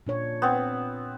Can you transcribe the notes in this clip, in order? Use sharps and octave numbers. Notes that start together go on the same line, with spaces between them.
A#2 D4 C#5
B3 C4